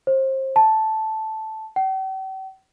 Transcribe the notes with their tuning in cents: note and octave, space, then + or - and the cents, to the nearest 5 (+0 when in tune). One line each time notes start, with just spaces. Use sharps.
C5 +30
A5 -5
G5 -45